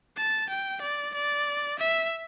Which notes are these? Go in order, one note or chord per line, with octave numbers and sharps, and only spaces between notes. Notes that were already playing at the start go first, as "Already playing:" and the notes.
A5
G5
D5
D5
E5